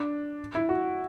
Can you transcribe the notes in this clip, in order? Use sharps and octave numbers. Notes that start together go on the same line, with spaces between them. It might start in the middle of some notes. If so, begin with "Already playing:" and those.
Already playing: D4
E4
F#4